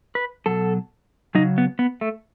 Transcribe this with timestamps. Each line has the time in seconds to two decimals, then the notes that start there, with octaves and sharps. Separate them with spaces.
0.15 B4
0.46 B2 F#3 A4
1.35 C#3 F#3 D#4
1.58 B3
1.79 B3
2.01 A3